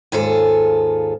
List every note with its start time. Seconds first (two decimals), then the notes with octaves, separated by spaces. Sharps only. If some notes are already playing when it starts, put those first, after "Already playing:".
0.12 D#2 G#2 F4 G#4 A4